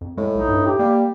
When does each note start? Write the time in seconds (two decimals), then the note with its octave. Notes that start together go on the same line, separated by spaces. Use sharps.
0.01 F2
0.17 A2 G#3
0.35 B1 D#4
0.48 G2
0.66 G4
0.79 G3 A#3